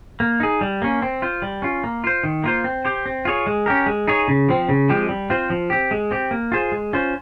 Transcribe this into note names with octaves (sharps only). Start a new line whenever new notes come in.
A#3
D#4 G#4
G3
A#3 C#4
C4
F4 C5
G3
C#4 F4
A#3
F4 C5
D#3
A#3 F4 C5
C4
G4 C5
C4
F4 G#4 C#5
G#3
C#4 G4 A#4
G#3
D#4 G#4 C#5
C#3
F3 C4
C#3
F3 G#3 C4 G4
G3
C4 F4 C5
F3
C4 G4
G#3
C4 G4
A#3
F4 G#4 C5
G#3
C#4 F4 C5